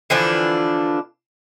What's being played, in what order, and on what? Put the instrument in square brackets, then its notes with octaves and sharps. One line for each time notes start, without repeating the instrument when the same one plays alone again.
[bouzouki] D3 E3 F3 D4